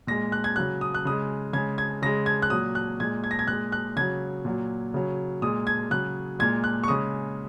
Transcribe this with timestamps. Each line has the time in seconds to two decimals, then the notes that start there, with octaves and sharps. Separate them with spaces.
0.07 A#2 G#3 A#6
0.32 F#6
0.44 G#6
0.56 C#3 F#3 F#6
0.81 D#6
0.94 F#6
1.05 C#3 G#3 D#6
1.53 C#3 G#3 G#6
1.78 G#6
2.02 C#3 G#3 A#6
2.26 G#6
2.42 F#6
2.50 A#2 F#3 D#6
2.75 F#6
3.00 A#2 G#3 G#6
3.24 G#6
3.31 A#6
3.39 G#6
3.47 A#2 G#3 F#6
3.72 F#6
3.96 C#3 F#3 G#6
4.45 A#2 F#3
4.94 C#3 F#3
5.42 A#2 G#3 D#6
5.67 G#6
5.91 C#3 F#3 F#6
6.39 A#2 G#3 G#6
6.64 F#6
6.84 C#6
6.88 C#3 G#3 D#6